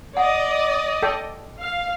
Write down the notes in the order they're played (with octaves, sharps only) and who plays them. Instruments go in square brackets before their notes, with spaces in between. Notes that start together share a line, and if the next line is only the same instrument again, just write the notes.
[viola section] D5 D#5 [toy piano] F#5
[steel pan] A4 G5
[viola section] F5